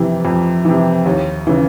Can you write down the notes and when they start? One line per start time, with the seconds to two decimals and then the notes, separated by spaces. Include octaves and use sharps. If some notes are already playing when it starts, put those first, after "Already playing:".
Already playing: F2 C3 E3
0.25 F2
0.65 C3 E3
1.05 D#2
1.47 C#3 E3